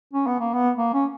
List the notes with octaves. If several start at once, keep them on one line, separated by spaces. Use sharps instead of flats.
C#4
B3
A#3
B3
A#3
C#4